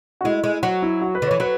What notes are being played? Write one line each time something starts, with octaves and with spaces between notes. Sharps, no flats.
F#4
G#3 E4
G#3
F#3 F#4
E4
F#4
B4
D3
E3 C#5
F#3 B4